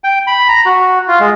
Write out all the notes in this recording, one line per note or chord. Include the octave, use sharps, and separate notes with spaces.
G5
B5
A#5
F#4
F4
G#3